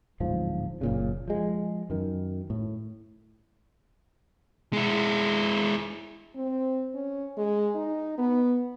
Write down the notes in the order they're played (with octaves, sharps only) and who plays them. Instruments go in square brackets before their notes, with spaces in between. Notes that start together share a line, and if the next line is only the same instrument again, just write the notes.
[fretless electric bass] D1 G#2 F3
F#1 A#2 C#3
F3 G#3
F#2 D#3
A2
[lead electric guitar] G#3 E4
[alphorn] C4
C#4
G#3
D#4
B3